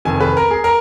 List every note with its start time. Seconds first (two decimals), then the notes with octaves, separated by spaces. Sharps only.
0.05 F1 F2 D#3 G#5
0.20 B4
0.37 A#4
0.51 G#4
0.64 A#4